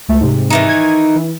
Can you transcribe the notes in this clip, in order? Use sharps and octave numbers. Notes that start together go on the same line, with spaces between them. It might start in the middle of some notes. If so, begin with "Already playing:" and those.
C#2 A3
G#2 C3
D#3 E3 D#4
G#6
E3